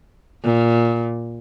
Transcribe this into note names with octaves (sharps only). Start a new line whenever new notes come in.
A#2